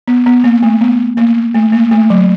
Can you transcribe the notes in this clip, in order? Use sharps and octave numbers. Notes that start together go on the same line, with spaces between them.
B3
B3
A#3
A3
B3
A#3
A3
A#3
A3
F#3